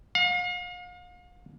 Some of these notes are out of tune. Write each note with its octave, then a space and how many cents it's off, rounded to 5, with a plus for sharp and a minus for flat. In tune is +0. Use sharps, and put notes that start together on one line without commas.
F5 +40